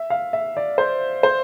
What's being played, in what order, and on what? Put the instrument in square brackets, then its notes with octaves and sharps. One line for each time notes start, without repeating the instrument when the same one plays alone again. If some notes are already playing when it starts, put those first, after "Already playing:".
Already playing: [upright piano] E5
F5
E5
D5
C5
C5